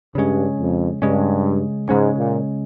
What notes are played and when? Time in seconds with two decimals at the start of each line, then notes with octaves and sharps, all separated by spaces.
0.15 G2 C#3 G#3 C#4
0.59 F2
1.02 G2 C#3 G#3 C#4
1.89 G#2 C#3 G#3 C#4
2.18 A#2